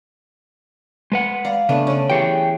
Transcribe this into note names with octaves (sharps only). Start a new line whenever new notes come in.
G#3 B4 F#5
D5 F5 A#5
C#3 A3 B3 D4
C#4 D5
E3 G4 G#4 C#5 G5